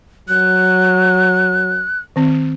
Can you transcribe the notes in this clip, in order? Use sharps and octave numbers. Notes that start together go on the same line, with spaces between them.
F#3 F#6
D#3 C4